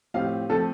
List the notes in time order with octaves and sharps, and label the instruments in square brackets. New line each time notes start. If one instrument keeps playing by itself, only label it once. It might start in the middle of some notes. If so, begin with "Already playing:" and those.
[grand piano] A2 F3 C4 G4 [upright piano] F5
[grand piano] F3 A3 C4 [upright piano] A4